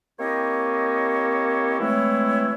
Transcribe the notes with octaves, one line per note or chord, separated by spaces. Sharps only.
A#3 C4 E4 G4 C#5 D#5
E3 G#3 A3 C4 E4 C#5